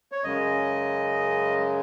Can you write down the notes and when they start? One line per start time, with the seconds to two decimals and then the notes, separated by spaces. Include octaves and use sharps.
0.12 C#5
0.23 F#2 C#3 G#3 D#5